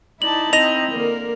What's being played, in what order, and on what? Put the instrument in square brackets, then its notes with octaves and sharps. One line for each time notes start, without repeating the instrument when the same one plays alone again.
[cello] D#4 E4 [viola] D5 A5 [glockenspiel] F#7
[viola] C4 [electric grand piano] D#5 A#6 [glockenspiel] F7
[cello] D3 [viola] A#3 A#4